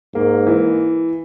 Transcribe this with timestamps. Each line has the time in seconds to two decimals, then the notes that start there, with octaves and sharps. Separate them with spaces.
0.15 G#2 A#3
0.47 E3